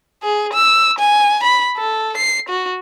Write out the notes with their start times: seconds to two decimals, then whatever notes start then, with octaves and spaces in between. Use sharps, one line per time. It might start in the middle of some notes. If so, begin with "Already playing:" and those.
0.23 G#4
0.53 E6
0.99 G#5
1.44 B5
1.77 A4
2.17 C7
2.49 F#4